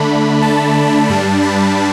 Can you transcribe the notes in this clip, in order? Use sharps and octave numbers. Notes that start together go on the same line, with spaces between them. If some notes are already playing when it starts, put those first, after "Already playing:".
Already playing: D3 A3 D4 B5
A5
G2 G3 D4 A5
B5